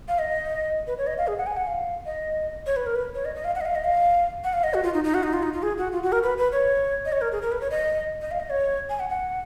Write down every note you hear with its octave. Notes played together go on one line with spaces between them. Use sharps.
F5
D#5
B4
C#5
D#5
F5
G#4
F#5
G#5
F#5
F5
D#5
C#5
B4
A#4
B4
C#5
D#5
D#5
F5
F#5
D#5
F5
D#5
F5
F#5
F5
D#5
F#4
F4
D#4
D#4
F#4
D#4
F4
D#4
F4
G#4
F#4
F4
F#4
A#4
B4
B4
C#5
D#5
C#5
A#4
G#4
A#4
B4
C#5
D#5
D#5
F5
D#5
C#5
G#5
F#5
F#5